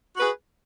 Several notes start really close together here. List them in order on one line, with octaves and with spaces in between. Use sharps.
F#4 B4 G#4